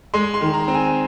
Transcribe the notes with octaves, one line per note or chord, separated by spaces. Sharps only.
G#3 C6
C6
D#3
A#5
C4
G#5